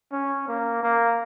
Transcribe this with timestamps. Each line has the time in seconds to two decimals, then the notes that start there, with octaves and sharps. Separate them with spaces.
0.12 C#4
0.48 A#3
0.83 A#3